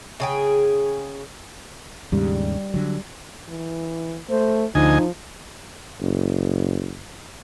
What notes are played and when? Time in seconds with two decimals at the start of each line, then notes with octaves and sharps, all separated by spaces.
0.20 C#3 G#4 G5
2.12 D#2 G#2 C#3 G3
2.74 D3 F#3
3.49 E3
4.30 A3 C5
4.75 D2 F3 D#4 D#5 G#5
6.00 F#1